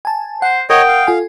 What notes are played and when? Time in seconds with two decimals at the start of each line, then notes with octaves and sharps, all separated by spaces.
0.05 G#5 A5
0.42 C5 F#5
0.70 A#4 C#5 D#5 F#5 G5 D#6
0.88 F5
1.07 F4 A4 G#5